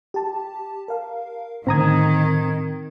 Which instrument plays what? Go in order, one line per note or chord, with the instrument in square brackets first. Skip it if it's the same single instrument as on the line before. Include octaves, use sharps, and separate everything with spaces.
[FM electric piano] G4 A5
A#4 F5
[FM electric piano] A2 D3 G#6 [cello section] D#3 [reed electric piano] C4 A#5 D#6